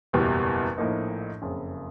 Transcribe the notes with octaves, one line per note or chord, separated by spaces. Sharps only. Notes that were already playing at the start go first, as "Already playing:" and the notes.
F#1 E2 B2 G3
A#1 A2 F3 A#3 D#4
F#1 F2 C#3